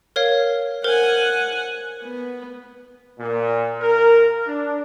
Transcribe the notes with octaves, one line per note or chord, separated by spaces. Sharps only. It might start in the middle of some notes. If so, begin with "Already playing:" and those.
A#4 C#5 F5
A#4 C5 F#5 G#5
B3
A#2
A#4
D4